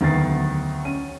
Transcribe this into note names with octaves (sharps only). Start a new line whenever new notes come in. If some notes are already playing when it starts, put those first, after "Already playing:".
D2 D#3 F#3 B3 A6 C7
C#4 D#7